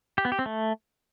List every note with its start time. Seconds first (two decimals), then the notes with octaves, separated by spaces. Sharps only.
0.18 G4
0.25 B3
0.32 G4
0.39 C4
0.46 A3